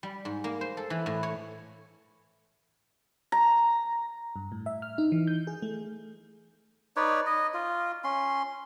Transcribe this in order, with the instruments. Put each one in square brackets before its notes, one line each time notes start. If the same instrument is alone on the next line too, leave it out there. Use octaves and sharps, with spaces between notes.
[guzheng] G3
G#2
A#3
C5
A4
E3
A2
C#5
[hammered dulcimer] A#5
[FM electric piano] G2
A2
E5
F6
D#4
E3
G6
G#4
A3
[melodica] D#4 B4 C#5 D5
D#5
F4
C#4 C6